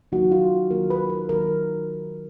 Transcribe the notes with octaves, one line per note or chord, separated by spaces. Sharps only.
D#3 F#3 A#3 D#4 F#4
F4
D#3 F#3 A#3 D#4 A#4
B4
A#4
D#3 F#3 A#3 D#4 A#4